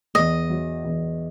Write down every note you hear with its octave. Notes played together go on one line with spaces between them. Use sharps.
E2 D#5
F#3
E2